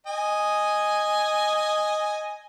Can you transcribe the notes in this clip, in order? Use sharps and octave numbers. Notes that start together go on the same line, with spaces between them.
D#5 G#5